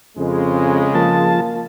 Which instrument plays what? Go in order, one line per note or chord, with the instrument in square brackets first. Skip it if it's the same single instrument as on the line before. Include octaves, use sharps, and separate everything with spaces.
[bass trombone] F2 [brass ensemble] C#3 G#3
[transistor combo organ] F3 A5 [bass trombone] A#3